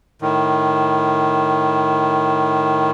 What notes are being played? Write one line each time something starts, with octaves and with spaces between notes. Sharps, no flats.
A2 D#3